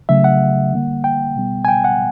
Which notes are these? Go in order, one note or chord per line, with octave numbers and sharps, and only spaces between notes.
C#3 F#3 A3 E5
F#5
D3 G3 A#3
G5
B2 G3 B3
G#5
G5
F#5